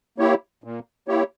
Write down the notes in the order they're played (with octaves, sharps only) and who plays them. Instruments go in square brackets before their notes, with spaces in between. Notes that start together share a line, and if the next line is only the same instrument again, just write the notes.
[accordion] A#3 E4 G4 C#5
A#2
A#3 E4 G4 C#5